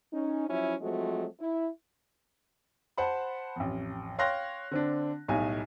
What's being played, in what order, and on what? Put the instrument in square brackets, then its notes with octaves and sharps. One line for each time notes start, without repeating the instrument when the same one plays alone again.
[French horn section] C#4 D#4
F3 F#3 C#4 E4
F3 F#3 G#3 A3 C4 F#4
E4
[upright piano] C5 F#5 A5 B5
A1 F2
C#5 F5 G5 C6 F#6 A#6
D3 C4 D4
B1 A2 G3 D#4 G#5